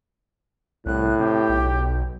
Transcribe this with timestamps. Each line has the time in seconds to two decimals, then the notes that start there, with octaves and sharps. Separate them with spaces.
0.86 C2 A2 F#6
1.19 C3 G4
1.49 B1